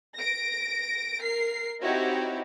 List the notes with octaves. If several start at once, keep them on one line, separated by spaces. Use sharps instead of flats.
A#6 D7
A#4 C7
C4 D#4 E4 F#4 G4 C#5